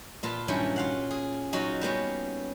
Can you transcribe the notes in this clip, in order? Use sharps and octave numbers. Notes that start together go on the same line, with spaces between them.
A#2 F4 B4 A5
G2 A#2 D#3 F#3 C#4 E4
F4 F5 F#5
G#4
F#3 D#4 F4 F#4 D#5
G3 A#3 B3 C#4